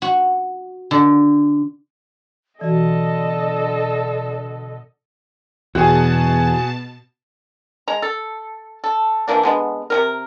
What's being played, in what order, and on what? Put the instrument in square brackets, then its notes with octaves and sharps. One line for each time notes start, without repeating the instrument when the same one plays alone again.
[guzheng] F#4
D3
[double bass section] B2 D3 [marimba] E3 F#4 [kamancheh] A4 D#5 [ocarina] D5
[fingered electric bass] E2 [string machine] B2 A5 [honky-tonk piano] F#4 G#4
[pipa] G#3 A#5
A4
A4
E3 F3 A#3 D4
D3 G#3 B3
C3 F#3 A#4